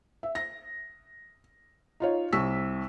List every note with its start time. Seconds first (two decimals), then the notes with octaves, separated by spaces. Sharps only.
0.23 E5
0.35 A#6
2.00 D#4 F4 C#5
2.33 C2 C#6 E6 B6